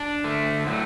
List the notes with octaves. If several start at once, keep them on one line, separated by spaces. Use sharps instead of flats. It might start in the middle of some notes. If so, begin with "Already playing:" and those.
Already playing: D4
D3 A3
A2 F#3 A3